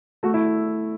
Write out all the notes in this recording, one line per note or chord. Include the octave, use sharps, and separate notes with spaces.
A3 F#4
E4